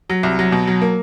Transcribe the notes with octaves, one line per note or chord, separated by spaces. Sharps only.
F#3
C2
F#3
B2
F#3
A#3